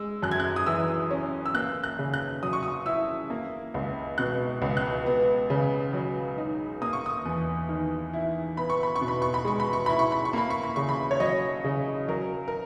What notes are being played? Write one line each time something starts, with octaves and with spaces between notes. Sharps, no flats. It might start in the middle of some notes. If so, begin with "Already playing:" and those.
Already playing: G#3 E6
F#2 F#6
G#6
F#6
D#6
E3 E6
C#4
E6
A#3 F#6
F#6
C#3
F#6
F#3 D#6
C#6
D#6
E4 E6
A#3
C#2
B2 F#6
C#2
F#6
B3
C#3
F#3
D#4
A#3 D#6
C#6
D#6
E2
D#3
E4
B3 B5
C#6
B5
C#6
B2
B5
C#6
B5
G#3 C#6
B5
C#6
E4 B5
C#6
B5
C#6
A#3 B5
C#6
B5
C#3 C#6
B5
C#5
F#3 D#5
C#3
F#3 A#4
A#4